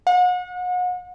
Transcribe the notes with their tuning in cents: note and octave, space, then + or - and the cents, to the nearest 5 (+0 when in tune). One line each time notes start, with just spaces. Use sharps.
F#5 -35